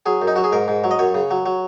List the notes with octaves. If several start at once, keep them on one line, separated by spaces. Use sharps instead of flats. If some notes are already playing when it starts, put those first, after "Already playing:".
F#3 G#4
F#2
D#4
F#3 F#4
G#4
G#2 A#4
G#2
F#3
D#5
F#2 C#5
C#3
F#3
F#3